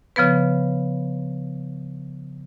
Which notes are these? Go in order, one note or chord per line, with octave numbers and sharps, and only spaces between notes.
C#3 F3 B3 B4